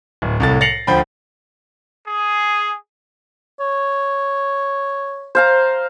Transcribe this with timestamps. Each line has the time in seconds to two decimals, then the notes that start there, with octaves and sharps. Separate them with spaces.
0.22 D1
0.40 C2 A2 A6
0.61 A6 A#6 C7 C#7 F7 F#7
0.87 D2 F3 G5 B5
2.06 G#4
3.60 C#5
5.35 C5 F5 A#5